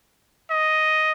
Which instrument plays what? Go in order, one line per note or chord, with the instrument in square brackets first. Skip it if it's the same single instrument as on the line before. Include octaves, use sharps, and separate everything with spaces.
[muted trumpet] D#5